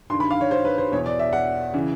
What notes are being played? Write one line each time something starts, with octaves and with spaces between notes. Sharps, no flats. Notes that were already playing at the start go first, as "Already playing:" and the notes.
G2 D#3 C6
B5
F5
C#5
C5
B4
C5
E2 B2 C#5
D5
E5
F#5
C#3 E3